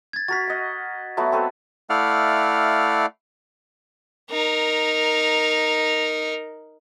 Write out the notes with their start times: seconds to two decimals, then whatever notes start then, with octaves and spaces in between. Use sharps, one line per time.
0.13 G#6 A6
0.28 F#4 A#4 A6 B6
0.48 D#5 F#5
1.17 F#3 A3 B3
1.32 C4 A4 B4
1.90 A3 E4 D5 F5 F#5 F6
4.30 D#4 A#4